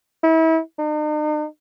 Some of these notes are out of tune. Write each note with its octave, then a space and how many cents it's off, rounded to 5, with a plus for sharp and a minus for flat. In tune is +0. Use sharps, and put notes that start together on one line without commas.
E4 -35
D#4 -45